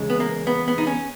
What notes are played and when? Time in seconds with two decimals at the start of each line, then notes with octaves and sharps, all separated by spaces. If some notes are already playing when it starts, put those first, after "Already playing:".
Already playing: E2 C#3 G#3
0.10 B3
0.20 A#3
0.47 B3
0.68 B3
0.78 D#4
0.87 C#4